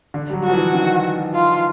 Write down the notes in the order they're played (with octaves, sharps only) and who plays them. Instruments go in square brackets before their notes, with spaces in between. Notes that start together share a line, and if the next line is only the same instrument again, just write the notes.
[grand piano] D3
G3
F#3
[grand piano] F3 [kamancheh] F#4
[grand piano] E3
D#3
[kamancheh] F4